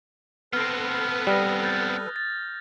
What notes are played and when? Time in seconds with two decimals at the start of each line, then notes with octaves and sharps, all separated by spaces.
0.53 B3 C4 A4 B4 F6 A#6
1.27 G3 D#6 F6 A#6
1.63 F#6 G6 A6
2.16 A6